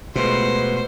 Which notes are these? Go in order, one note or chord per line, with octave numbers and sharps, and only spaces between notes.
B2 G#3 A3 F4 B4 C5